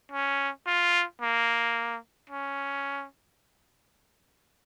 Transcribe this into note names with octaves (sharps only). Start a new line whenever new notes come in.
C#4
F4
A#3
C#4